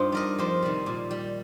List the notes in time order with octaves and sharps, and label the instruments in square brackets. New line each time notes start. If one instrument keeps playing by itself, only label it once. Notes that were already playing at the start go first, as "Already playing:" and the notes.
Already playing: [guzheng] G2 D#4 F4 G4 C5
G3 A#4 D#5
F2 G4 C5
C3 D#3 G3
A#2
G3